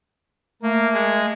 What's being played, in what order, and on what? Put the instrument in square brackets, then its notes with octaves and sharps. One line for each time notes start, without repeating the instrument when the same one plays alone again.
[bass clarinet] A3 [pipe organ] A#3
[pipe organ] G#3 G#4